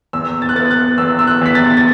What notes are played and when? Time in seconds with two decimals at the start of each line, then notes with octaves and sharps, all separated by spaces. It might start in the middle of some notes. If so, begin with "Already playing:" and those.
0.13 E2 E6
0.42 A6
0.49 F#6
0.55 B3 A6
0.70 F#6
0.98 E2 E6
1.19 E6
1.27 F#6
1.41 E2 B6
1.55 A6
1.77 A6